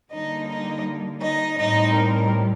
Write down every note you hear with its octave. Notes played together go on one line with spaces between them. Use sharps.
D3 G3 A#3 D#4 D#5
D#4 D#5
D#4 D#5
A2 G3 C4 D#4 D#5
A#4